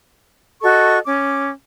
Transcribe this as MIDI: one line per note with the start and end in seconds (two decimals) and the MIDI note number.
0.62 0.98 66
0.62 0.98 69
0.62 0.98 75
0.62 0.98 85
1.06 1.48 61
1.06 1.48 86